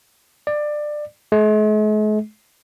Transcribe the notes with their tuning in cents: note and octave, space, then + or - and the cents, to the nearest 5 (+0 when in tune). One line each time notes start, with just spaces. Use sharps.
D5 +20
G#3 +45